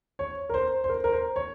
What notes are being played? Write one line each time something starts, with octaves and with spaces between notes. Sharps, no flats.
C#5
A#4
C5
C5
A#4
A#4
C5
C#5